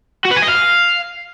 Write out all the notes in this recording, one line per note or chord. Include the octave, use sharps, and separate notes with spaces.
F#4
B4
G#5
D#5
F5